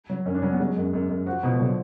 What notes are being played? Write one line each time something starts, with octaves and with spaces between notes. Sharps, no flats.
F#3
F#2 C#4
D4
F#3 C#4
B3
F#3 G#3
F#2
F#2
F#2
F3 F#4
B2 F3
F3
D3 F#3